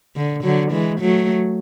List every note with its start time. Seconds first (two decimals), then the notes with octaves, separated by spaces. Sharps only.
0.16 D3
0.43 D3 F#3
0.72 E3 G#3
1.00 F#3 A3